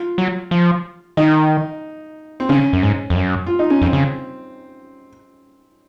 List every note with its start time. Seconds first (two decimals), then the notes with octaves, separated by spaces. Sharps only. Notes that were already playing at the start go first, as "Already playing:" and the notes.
Already playing: F4
0.18 F#3
0.51 F3
1.17 D#3 D#4
2.40 C4
2.49 C#3 C#4
2.73 F#2
2.83 G#2
3.10 F2
3.15 F#2
3.47 F4
3.59 D#4
3.70 C#4
3.82 F2 C4
3.93 C#3